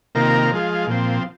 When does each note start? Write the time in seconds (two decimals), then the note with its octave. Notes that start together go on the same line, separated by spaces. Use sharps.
0.15 C3 D#3 A#3 F4 A#4
0.51 F3 G#3 F4
0.87 A#2 F3 C4